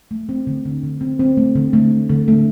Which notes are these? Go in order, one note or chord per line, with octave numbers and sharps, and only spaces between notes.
A3
C4
D3
D3
D3
C4
C4
A3
D3
A3
A3
D3
A3